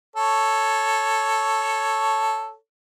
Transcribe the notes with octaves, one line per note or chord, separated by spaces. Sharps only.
A4 C#5